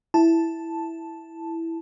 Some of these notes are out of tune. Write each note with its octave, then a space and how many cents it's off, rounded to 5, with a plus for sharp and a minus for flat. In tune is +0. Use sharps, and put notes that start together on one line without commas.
E4 +0 A5 +0